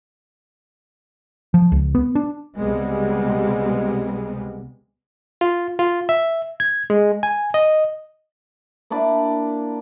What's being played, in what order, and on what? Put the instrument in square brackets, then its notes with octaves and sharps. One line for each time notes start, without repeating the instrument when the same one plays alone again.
[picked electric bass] F3
C#2
B3
D4
[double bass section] C#2 C3 G3 G#3 B3
[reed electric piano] F4
F4
E5
G#6
G#3
G#5
D#5
[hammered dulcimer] A#3 D4 E4 D5